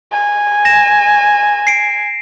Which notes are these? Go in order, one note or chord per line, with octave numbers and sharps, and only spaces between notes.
G#5
A#6 E7
C7 D7